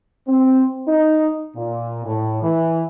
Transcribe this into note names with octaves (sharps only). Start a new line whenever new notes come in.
C4
D#4
A#2
A2
E3